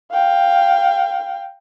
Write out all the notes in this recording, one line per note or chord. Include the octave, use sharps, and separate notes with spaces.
F5 G5